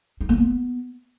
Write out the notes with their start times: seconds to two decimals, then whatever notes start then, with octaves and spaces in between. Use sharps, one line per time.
0.21 D#4
0.29 A#3
0.37 B3